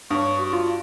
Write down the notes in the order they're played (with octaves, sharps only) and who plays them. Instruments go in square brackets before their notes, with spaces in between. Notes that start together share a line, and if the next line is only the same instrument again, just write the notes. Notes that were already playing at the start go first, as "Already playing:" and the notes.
[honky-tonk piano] G2 [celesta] C#5 D#6 [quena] C#6
[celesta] F#4
[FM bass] F4